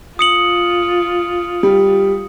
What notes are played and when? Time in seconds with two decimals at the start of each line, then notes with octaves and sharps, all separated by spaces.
0.19 F4 D#6 C#7 F#7
1.63 G3